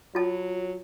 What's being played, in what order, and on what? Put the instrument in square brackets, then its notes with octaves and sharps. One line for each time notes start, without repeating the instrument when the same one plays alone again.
[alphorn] F#3 [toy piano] F4 A5